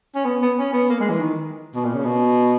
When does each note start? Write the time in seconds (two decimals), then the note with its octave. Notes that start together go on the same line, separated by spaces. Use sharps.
0.15 C#4
0.25 B3
0.42 B3
0.58 C#4
0.73 B3
0.89 A#3
1.00 G#3
1.10 E3
1.20 D#3
1.75 B2
1.85 A#2
1.95 C#3
2.05 B2